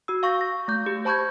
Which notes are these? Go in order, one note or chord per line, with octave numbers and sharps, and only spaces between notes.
F#4 E6
F5 C#6 G6 A#6
A#6
A3 G6
G4
C5 A5 B5 C#6 G6 G#6